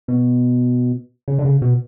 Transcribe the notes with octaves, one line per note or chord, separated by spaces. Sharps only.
B2
C#3
D3
C#3
B2